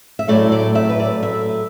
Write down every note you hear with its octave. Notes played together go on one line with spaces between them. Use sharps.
E5
A2 F#3 A3 D5
D5
E5
B4
D5
E5